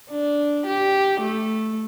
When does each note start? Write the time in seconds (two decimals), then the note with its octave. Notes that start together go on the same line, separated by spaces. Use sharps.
0.11 D4
0.66 G4
1.21 A3